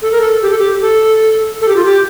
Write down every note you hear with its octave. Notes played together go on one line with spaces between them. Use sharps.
A4
A#4
A4
G4
A4
G4
A4
A4
G4
F4
G4